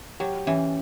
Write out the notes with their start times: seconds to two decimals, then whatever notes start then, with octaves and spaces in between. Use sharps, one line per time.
0.20 F#3 G4
0.47 E3 C#4